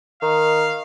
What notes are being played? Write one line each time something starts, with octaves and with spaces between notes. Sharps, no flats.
D#3 F5